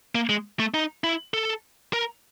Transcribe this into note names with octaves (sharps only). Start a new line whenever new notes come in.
A#3
G#3
A3
D#4
E4
A4
A#4